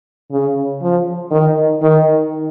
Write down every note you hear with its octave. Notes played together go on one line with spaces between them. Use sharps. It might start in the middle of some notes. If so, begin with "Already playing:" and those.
C#3
F3
D#3
D#3